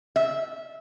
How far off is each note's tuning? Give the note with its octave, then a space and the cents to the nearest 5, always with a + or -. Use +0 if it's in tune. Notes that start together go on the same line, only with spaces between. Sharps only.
E5 -15